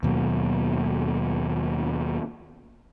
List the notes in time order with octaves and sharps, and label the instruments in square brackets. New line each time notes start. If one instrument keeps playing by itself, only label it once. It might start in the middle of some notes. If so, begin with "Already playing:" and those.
[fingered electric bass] D#2 B2 F#3 A#3